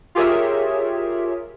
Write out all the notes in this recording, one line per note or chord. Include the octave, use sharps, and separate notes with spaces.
F4 G4 G#4 A#4 C#5 E5